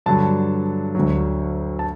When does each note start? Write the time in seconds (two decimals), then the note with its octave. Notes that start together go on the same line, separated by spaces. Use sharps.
0.06 G2 D3 F#3 A5
0.95 D2 D3 F#3
1.79 A5